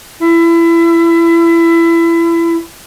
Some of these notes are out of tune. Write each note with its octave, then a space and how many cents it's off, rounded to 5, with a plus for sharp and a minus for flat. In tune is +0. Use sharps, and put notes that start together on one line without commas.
E4 +25